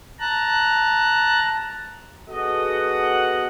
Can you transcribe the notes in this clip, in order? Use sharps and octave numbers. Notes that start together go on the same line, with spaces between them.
A5 A#5 F#6
B3 F#4 G#4 A4 D#5 F#5